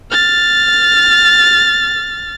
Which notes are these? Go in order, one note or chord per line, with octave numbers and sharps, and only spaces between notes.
F6 A6